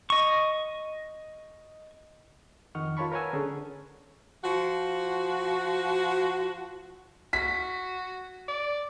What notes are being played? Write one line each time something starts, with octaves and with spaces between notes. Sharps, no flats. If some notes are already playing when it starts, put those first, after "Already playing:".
D#5 C#6
F2 D#3 D#5 F#5 C#6 F6
F4 A#4 C#5 A5 B5 C#6
A#4 B4 C#5 F#5 G#5 E6
D3 C#4 G#4 A4
F3 F#4
F#4 B6
D5